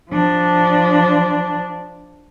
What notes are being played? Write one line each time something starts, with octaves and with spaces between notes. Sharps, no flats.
F3 D4